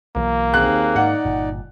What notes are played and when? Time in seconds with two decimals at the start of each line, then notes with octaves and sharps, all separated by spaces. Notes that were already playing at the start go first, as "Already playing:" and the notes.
0.16 B1 E3 F#3 A#3
0.54 D#2 C4 G#4 F#6
0.96 G#2 D#4 D5 F#5
1.25 G1 A#2